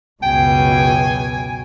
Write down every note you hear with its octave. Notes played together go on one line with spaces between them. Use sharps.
C#2 F#2 B2 G5 G#5